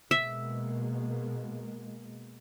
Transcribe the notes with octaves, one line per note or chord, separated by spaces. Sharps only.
B2 G#3 A#3 E5